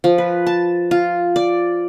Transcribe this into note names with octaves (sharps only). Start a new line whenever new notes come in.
F3
B4
A5
F4
D5